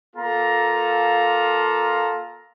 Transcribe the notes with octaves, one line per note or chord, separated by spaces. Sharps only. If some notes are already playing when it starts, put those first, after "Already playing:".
A#3 F4 A4 A#5